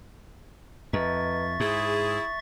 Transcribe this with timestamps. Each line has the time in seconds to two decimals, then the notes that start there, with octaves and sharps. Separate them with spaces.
0.93 F2 B4 D#5 E5 A#5 C#6 A6
1.60 G#2 E4 G#4 D#6